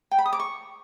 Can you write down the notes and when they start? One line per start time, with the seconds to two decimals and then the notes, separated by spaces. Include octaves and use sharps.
0.11 G5
0.18 B5
0.26 D#6
0.33 D6
0.40 C#6